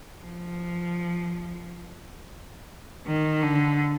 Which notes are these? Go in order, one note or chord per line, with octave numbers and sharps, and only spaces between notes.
F3
D#3
D3